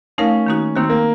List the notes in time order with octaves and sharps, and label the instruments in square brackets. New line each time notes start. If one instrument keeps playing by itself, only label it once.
[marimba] A3 D#4 A#4 F5 [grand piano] C#4
[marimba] D#3 A#3 D#4 F#4
[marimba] D#3 A#3 D#4 F#4 [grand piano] C4
[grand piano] A#3